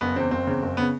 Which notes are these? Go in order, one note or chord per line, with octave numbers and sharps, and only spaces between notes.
F#1 B3
E2 C#3 C4
F#1 C4
E2 C#3
F#1
C#3 B3